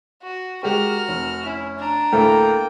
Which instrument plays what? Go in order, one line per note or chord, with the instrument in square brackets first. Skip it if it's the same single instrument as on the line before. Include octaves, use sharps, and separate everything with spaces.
[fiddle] F#4
[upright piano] G#3 G4 [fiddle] F#4 F6 [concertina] A#4
[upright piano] F1
[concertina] C#4 [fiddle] E4
[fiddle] D4 A#5
[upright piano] D2 A2 E5 [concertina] A#3 A#4 G5 [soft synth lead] A4